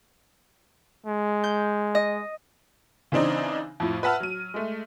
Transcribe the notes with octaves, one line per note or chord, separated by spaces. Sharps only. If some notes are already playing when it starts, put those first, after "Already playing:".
G#3
G6
D#5
C#3 E3 C4 D4 D#4
F2 A2
B4 E5 F#5 A5 F6
F#3 D#7
G#3 A3